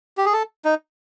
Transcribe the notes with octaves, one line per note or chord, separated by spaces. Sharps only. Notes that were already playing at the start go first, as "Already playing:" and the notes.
G4
G#4
A4
D#4